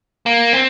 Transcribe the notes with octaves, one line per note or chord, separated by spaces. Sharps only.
A#3
C4